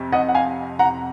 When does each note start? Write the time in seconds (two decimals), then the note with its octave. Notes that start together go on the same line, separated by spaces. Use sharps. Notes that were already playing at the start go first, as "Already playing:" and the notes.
Already playing: F2 C3
0.12 D#5 F#5
0.29 F#5
0.35 F5 G#5
0.79 F#5 A#5